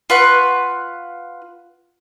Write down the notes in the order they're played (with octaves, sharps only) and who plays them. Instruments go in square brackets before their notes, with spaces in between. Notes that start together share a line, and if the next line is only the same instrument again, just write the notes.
[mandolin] F4 B4 F#5 C#6